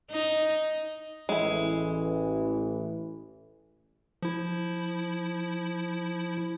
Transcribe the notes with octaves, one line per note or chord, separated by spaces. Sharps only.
D#4
A1 E3 G#3 E4
F3 E4